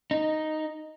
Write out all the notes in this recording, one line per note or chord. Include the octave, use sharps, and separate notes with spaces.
D#4